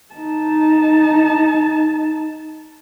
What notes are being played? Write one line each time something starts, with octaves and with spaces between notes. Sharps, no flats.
D#4 A5